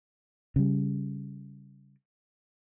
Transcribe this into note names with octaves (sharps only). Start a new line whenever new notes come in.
C#3 G3